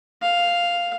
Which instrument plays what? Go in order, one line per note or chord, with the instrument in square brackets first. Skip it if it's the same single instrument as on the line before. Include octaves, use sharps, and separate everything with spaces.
[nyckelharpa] F5